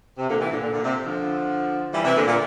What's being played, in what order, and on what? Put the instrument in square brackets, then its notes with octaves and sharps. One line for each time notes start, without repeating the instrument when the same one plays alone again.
[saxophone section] C3
A#2 D3
C3 E3
A#2 D3
A#2 D3
A#2 D3
C3
D3 F3
E3 G3
C3 E3
A#2 D3
A#2